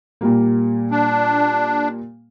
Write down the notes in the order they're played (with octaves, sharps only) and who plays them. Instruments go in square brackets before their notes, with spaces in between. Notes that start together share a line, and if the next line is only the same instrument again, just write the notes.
[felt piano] A#2 G3 A#3
[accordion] D4